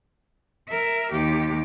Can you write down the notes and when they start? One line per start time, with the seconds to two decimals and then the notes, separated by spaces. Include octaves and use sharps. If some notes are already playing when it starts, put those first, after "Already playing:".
0.68 A#4 E5
1.12 D#2 G4